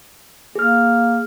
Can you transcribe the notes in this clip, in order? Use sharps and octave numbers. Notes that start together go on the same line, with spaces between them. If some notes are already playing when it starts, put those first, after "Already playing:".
A#3 G#4 F6